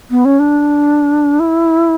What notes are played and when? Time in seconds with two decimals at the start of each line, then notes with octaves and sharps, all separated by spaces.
0.10 B3
0.25 C#4
0.39 D4
1.40 E4